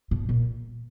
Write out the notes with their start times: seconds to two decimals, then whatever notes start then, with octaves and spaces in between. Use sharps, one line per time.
0.11 A2
0.29 A#2